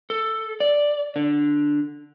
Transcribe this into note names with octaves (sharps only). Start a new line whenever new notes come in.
A4
D5
D3